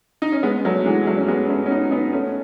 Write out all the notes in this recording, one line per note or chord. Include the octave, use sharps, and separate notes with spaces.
D#4
C#4
G#3 B3
F#3 A3
E3 G#3
F#3 A3
C#4
G#3 B3
A3 C#4
C#4
B3 D#4
B3 D#4
A3 C#4